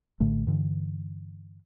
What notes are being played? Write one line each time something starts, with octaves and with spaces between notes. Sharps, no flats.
A#1 A2 D3 A3
G2 D3 E3